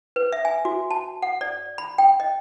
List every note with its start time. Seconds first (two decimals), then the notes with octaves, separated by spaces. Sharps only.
0.16 B4
0.32 E5
0.45 G#5
0.65 F#4
0.91 A5
1.22 F#5
1.41 D5
1.78 B5
1.98 G5
2.20 D#5